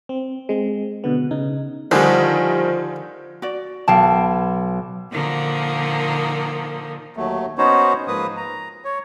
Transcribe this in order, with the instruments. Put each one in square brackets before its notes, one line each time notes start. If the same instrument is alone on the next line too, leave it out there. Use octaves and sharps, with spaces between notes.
[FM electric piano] C4
G#3 C4
B2 D3 B3
C#3 D#4
[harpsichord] D3 [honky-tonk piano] D#3 G3 [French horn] F3 [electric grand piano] C5 G#5
[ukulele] F#4 D5
[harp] B1 [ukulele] F5 G5 A5
[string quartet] A#2 D3 D#3 F3 A#3
[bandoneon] D#2 F#3 A3
B3 C#4 D#4 F#4 C5 C#5
G#2 F3 A#3 B4 D#6
A#5
C#5